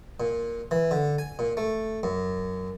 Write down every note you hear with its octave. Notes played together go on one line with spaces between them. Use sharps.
A#2
E3
D3
G#5
A#2
A3
F#2